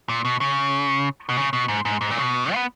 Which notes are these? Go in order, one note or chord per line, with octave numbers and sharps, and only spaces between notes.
A#2
B2
C#3
B2
C#3
B2
G#2
G#2
G#2
A#2
C#3
B2
B3